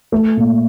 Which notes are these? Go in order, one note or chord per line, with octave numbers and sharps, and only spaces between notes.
A3
A#2